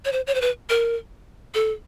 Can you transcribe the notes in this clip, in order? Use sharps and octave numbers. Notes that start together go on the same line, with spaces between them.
C#5
C5
C#5
C5
B4
A#4
A4